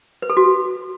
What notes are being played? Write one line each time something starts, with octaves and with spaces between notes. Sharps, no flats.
B4
A4
F#4